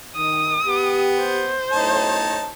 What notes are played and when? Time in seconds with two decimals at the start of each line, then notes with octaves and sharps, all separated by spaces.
0.16 D#3 D#6
0.66 B3 G4
1.19 C5
1.72 B1 F#2 A2 D#4 C#5 A5